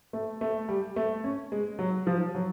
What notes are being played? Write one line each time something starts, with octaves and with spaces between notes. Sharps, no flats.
A3
A3
G3
A3
C#4
G#3
F#3
F3
F#3